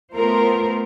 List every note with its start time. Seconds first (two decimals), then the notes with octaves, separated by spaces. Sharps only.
0.14 A3 B3 F4 A#4 C5